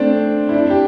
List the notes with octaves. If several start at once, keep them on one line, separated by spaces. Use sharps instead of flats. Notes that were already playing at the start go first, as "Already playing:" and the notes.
Already playing: A3 C4 D4
E4
D4
G4